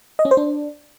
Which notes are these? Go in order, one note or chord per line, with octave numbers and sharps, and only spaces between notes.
D#5
C#4
C5
D4